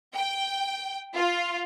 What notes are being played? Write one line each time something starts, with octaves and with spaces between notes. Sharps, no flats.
G5
F4